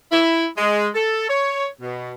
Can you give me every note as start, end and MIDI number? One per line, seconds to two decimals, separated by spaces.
0.11 0.45 64
0.57 0.88 56
0.94 1.28 69
1.29 1.67 73
1.81 2.13 47